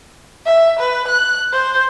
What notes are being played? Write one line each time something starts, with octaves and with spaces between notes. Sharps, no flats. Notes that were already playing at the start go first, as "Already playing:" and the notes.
E5
B4
F#6
C5